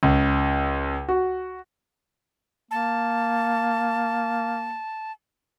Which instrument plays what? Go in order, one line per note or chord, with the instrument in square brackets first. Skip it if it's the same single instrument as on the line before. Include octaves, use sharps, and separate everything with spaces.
[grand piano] C#2
F#4
[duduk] A#3 [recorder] A5